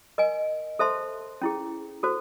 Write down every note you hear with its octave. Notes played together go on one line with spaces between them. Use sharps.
A#4 D#5 G#5
A4 C5 E5 A5 C6
C#4 E4 G#4
F#4 A4 C5